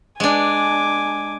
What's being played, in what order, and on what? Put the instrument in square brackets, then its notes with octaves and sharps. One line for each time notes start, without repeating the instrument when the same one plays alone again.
[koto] G#3 D4 [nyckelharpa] G#5 D6